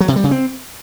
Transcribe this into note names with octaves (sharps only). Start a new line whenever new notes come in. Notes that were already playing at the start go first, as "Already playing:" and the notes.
F#3
C3
G3
C#3
C4